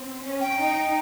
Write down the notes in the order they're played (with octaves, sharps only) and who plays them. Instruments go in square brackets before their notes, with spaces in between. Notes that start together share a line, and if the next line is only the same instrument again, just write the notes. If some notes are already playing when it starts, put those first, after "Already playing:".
Already playing: [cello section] C4
C#4
[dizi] G5
[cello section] D#4